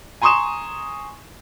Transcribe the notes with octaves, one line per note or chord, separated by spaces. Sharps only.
G#5 A#5 C6 C#6 D#6 E7